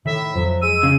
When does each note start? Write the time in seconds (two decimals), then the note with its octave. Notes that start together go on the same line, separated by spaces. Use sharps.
0.06 A2 D#3 E5
0.35 F2 F3 F#3
0.62 G#3 E6 D#7
0.83 C#3